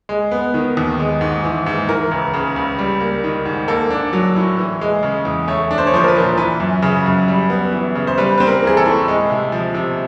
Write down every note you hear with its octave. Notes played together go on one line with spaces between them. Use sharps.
G#3
B3
D#3
D#2
G#3
G#2
E3
G#2
E3 A#4
C#2
C#3
C#2
G3
A#3
D#3
G#2
A#3 A4
D4
F#3
A2
E3
G#3
C#3
E2
A3 C#5
D4
C5
C#5
F3 C5
A#4
B4
A#2
E3 B4
F#2
C#3
F#2
G3
B3
E3
C#3
C5
G3 B4
C4 B4
A#4
E3 G#4
A4
A2
G#3
C3
F3
C3